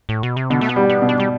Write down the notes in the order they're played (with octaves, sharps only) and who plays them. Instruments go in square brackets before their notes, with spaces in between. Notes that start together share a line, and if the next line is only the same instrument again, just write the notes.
[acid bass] A2
B2
C3
[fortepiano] B2 [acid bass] D3
[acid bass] A3
B3
[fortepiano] G3
[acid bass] B3
[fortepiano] B2
[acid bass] D4
G3